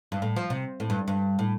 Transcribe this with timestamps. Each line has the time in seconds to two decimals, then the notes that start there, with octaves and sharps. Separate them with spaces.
0.12 G2
0.22 A2
0.36 F3
0.50 C3
0.80 A2
0.90 G2
1.08 G2
1.39 A2